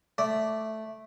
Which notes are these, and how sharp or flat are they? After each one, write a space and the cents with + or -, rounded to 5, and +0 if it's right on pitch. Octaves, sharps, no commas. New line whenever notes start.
A3 -5 D5 -5